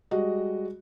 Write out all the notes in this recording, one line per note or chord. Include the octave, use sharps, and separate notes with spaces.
G3 G#3 F#4 D#5